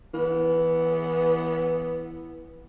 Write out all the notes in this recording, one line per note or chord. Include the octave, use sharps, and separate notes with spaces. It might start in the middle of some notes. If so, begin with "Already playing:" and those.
E3 B3